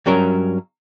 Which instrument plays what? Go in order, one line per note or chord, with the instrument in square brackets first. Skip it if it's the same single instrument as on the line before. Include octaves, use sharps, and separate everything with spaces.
[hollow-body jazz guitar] G2 F#3 C#4 A#4